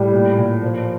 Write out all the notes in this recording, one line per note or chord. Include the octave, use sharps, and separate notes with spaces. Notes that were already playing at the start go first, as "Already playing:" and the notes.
Already playing: A2 G3
A#2
A#2
A#2 F3